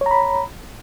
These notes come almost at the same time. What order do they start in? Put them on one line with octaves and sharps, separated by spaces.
C#5 A#5 B5